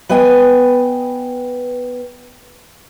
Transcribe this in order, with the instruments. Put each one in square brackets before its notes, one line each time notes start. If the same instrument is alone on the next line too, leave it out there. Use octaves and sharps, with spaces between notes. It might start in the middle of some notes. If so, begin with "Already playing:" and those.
[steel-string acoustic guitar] B3 B4 D#5 G5 G#5